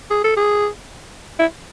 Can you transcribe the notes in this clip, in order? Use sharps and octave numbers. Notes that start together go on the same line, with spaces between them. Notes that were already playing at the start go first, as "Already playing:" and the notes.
G#4
A4
G#4
E4